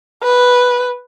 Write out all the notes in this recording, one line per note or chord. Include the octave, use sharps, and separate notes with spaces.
B4